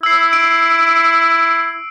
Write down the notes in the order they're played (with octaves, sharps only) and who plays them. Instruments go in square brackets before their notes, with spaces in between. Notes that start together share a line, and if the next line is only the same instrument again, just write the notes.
[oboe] E4 [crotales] E6 C7
[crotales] D7